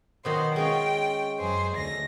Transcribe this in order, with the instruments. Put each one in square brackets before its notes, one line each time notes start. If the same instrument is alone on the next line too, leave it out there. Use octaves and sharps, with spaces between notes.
[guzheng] B2 D#3 F#3 [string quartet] C5
[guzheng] G#3 C#4 F4 [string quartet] G5
[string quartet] F#2 G#4 C5
D2 A#6